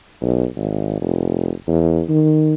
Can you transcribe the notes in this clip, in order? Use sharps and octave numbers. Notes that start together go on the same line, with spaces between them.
B1
G#1
F1
E2
D#3